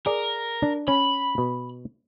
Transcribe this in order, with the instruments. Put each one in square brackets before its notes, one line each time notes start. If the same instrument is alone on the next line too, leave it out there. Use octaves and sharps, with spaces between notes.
[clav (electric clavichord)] G#4 D5 [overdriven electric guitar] A#4
[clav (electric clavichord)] D4
[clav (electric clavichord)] C#4 [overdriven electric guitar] B5
[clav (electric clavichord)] B2